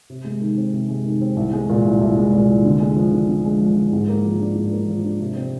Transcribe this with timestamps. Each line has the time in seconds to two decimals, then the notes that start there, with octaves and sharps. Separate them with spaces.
0.10 C3
0.24 G#3
0.41 D#3
0.57 C4
0.73 C3
0.89 G#3
1.05 D#3
1.21 C4
1.36 C2
1.53 G#3
1.69 A#2
1.84 C2
2.01 C2
2.17 G#3
2.32 A#2
2.48 C2
2.65 D3
2.80 G#3
2.96 F3
3.12 D3
3.28 D3
3.45 G#3
3.60 F3
3.76 D3
3.93 G#2
4.09 A#3
4.25 F3
4.40 D4
4.56 G#2
4.72 A#3
4.88 F3
5.04 D4
5.20 C3
5.36 C4